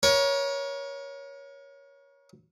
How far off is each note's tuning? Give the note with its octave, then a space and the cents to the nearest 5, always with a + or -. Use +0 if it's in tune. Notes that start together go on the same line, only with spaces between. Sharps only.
A#4 +40 C#5 +5